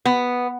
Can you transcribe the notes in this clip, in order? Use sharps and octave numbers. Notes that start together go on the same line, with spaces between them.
B3